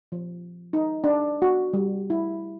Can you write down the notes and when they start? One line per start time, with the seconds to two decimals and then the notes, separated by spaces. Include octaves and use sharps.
0.12 F3
0.73 D#4
1.04 D4
1.42 F#4
1.73 G3
2.10 E4